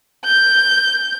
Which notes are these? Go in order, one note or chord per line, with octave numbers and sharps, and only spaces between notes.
G6